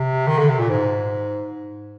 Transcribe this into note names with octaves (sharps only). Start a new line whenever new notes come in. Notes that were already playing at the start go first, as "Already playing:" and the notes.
Already playing: C3
D#3
D3
C3
A#2
G#2